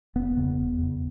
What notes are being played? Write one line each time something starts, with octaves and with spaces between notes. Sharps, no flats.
E1 B3
E2 C#3
E1
E2 C#3